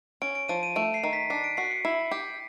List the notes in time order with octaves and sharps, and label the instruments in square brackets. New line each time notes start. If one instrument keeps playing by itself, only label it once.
[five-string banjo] C#4 [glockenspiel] D7
[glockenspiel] D7
[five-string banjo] F3 [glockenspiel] D#7
[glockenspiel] D#7
[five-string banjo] A3 [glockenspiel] D7
[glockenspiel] C7
[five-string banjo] D#3
[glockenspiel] B6
[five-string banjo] D4 [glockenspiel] C7
[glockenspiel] D7
[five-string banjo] F#4 [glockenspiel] C7
[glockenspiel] C#7
[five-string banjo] E4
G4